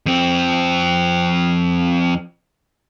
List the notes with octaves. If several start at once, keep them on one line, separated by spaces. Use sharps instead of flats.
F2 C4